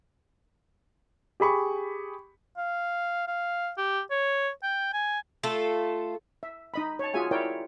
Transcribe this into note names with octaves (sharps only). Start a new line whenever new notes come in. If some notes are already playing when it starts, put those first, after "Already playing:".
G4 G#4 B5 C#6
F5
F5
G4
C#5
G5
G#5
A3 F4 A4
E5
D#4 D#5 B5
C#5 A5
F4 F#4 G#4 E5 G#5
E4 A#4 C#5 D5 G5